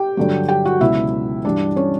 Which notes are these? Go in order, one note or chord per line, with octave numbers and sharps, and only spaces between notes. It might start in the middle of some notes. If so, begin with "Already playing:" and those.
Already playing: G4 G5
G2 D3 F#3
G4 G5
F#4 F#5
C#2 B2 F#3 E4 E5
G2 E3 G3 D4 D5
C#4 C#5